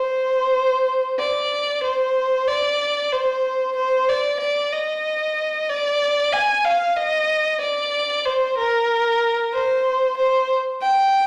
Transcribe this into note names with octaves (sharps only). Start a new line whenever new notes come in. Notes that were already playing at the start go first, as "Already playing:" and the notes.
Already playing: C5
D5
C5
D5
C5
C5
D5
D5
D#5
D5
G#5
F5
D#5
D5
C5
A#4
C5
C5
G5